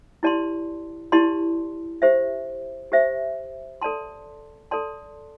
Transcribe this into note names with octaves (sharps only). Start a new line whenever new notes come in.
E4 G4 D5 A5 C6
E4 G4 D5 A5 C6
G4 C5 E5
G4 C5 E5
A4 D5 A5 C6
A4 D5 A5 C6